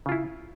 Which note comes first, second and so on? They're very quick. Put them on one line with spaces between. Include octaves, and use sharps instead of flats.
C#3 F4 E4